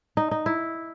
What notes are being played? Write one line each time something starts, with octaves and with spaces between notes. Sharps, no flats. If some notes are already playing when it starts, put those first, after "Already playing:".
D#4
D#4
E4